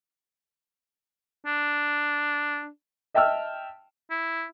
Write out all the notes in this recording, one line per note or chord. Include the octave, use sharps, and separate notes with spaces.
D4
D#5 E5 G5 A5 E6 F6
E4